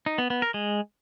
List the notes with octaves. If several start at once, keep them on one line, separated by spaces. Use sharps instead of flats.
D#4
B3
B3
A#4
G#3